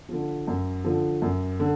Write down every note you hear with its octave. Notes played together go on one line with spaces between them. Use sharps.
D3 F3
F#2
D3 F3
F#2
D3